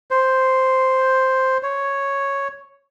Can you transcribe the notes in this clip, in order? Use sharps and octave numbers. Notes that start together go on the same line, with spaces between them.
C5
C#5